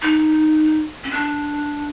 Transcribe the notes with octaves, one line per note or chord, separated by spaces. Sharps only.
D#4
C#4
D4